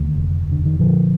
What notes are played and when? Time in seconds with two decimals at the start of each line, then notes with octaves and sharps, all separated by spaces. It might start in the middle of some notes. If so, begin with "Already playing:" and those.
Already playing: D2 D#3
0.15 F1
0.48 F1 D3
0.65 D#3
0.79 A#2 D3 F3